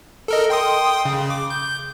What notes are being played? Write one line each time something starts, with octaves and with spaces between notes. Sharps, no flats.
A4 A#4 D#5
G5 C6 D#6
C#3
D6
G6